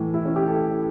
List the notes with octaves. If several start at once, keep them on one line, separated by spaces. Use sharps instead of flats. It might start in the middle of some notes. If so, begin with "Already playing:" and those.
Already playing: A2 E3 A3
E4
C#4
G4
A4